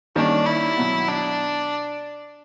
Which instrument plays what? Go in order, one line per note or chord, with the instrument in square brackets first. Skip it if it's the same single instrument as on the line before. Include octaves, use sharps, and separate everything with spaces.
[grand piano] D#3 G3 A#3 C#4 [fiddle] D4
[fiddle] E4
[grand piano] B2 F#3 B3
[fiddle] D4